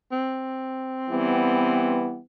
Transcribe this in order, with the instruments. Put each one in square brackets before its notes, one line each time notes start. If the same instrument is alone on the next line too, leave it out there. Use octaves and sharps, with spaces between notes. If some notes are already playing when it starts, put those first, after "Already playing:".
[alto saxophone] C4
[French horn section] E3 G3 B3